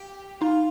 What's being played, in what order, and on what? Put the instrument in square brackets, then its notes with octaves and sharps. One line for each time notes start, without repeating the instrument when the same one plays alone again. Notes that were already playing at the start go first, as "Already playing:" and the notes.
Already playing: [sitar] G4
[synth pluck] D#4 [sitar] F4